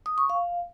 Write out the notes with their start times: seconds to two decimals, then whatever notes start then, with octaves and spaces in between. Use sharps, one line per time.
0.06 D#6
0.18 C#6
0.30 F5